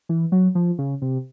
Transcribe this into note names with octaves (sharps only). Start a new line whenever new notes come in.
E3
F#3
F3
C#3
C3